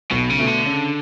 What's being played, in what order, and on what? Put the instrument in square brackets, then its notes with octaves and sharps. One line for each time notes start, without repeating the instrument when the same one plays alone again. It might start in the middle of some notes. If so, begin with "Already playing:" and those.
[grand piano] B1 [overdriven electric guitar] B2
[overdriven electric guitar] C#3
[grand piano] B2 A3
[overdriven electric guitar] D3
[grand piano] C#3